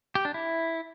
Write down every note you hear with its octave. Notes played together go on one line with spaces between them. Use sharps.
G4
D4
E4